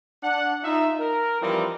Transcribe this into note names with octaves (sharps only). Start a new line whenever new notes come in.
D4 F#5
D#4 F4 E5
A#4
E3 F3 G3 C4 D#4 D5